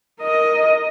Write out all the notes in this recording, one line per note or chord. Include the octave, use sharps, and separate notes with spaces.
A#4 D#5